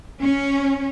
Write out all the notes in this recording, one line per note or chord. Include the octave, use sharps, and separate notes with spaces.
C#4